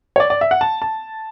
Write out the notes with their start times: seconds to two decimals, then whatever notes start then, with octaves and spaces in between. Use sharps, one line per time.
0.16 C#5
0.20 D5
0.30 D5
0.41 E5
0.51 F#5
0.61 A5
0.82 A5